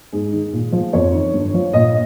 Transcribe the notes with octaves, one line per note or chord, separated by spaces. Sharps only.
G#2 G#4
D#3
A#2
F3
F2 C#5
D#3
G2
F3
A#2 D#5